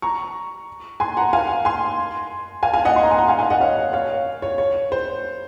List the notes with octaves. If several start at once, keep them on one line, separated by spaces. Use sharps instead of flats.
A#5 C#6
G#5 C6
F#5 A#5
F5 G#5
G#5 C6
F5 G#5
F5 G#5
D#5 F#5
C6
A#5
G#5
F#5 A#5
F5 G#5
F5 G#5
D#5 F#5
C#5 F5
C#5 F5
C#5
C#5
C5